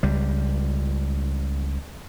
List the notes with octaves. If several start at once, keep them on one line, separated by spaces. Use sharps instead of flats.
C#2 G3